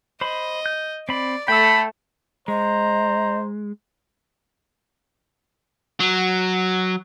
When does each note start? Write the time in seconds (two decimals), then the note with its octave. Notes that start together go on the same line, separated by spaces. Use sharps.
0.21 C5 D#5 B5
0.66 G6
1.09 C4 D5 B5
1.48 A3 A4 G5 B5 E6
2.48 G#3 C5 D#5 A#5
6.00 F#3